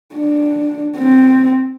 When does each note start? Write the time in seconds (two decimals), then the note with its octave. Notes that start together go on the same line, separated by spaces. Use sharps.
0.15 D4
0.97 C4